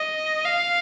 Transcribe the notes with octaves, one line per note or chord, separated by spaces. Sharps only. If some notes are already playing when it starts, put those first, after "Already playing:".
Already playing: D#5
F5